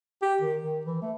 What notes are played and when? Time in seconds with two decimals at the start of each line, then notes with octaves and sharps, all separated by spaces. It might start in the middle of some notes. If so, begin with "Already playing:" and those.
0.22 G4
0.41 D#3
0.61 D#3
0.85 E3
1.02 A3